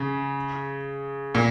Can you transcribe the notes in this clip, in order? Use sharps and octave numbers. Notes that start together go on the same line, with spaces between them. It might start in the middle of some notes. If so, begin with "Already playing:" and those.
Already playing: C#3
A#2